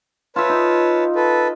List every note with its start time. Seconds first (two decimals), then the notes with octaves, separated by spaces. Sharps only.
0.36 F4 B4 C#5 E5 A5
0.49 D#4
1.16 A4 B4